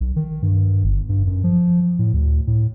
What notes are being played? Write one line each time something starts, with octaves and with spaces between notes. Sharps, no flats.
B1
D#3
G2
G1
G2
F#2
F3
A2
D2
A2